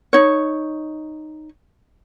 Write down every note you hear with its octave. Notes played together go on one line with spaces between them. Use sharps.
D#4 C#5